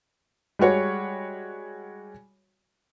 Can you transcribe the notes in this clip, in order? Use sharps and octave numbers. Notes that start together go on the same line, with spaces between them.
G3 G#3 F#4 C#5